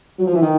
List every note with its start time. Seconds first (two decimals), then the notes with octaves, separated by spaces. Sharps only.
0.18 F#3
0.26 F3
0.35 E3
0.42 D#3